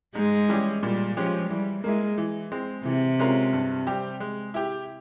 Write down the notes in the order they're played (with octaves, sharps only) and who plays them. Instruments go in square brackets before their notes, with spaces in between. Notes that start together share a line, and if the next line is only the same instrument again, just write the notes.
[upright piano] G#2 [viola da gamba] G#3
[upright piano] E3 G3 C#4 G4
[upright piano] A#2 [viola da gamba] G3
[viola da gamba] F3 [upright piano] G#3 C#4 G4
[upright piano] E3 [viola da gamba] G3
[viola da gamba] G#3 [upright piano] A#3 E4
[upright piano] E3
G#3 C4
[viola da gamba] C3 [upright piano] E3
[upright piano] G#3 C#4 F4 A#4
G2
G3 C4 G4
G#3
E4 G4